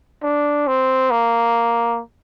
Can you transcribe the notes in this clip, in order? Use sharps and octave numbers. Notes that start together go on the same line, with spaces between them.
D4
C4
A#3